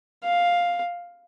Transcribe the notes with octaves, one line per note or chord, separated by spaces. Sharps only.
F5